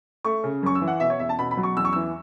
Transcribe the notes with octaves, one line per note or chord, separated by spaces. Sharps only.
A3 C#6
C#3
F#2 C#6
E6
E3
F#5
B2 E5
C#5
E2 E5
A5
B2 B5
B5
F#3
C#6
E2 E6
C#6
E3 E6